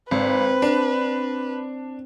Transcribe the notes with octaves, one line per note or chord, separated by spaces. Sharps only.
G#1 C4 B4
D4